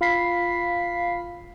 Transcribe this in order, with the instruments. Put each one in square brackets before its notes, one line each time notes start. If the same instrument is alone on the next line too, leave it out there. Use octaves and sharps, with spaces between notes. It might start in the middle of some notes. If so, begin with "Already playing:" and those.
[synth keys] F4 F5 B5 B6 C7